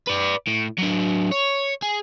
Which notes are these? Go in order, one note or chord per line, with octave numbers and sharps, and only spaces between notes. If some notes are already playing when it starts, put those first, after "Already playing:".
B4 D5
A2
F#3 D4
C#5
G#4